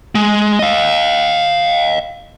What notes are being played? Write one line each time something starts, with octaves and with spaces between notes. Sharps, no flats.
G#3
D#5 F5